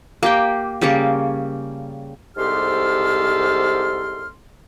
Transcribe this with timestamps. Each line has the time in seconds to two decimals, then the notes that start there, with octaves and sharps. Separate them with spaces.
0.23 A#3 G4 G5
0.81 C#3 G3 A#3 C#5
2.37 C2 G#2 G4 A4 C6 F6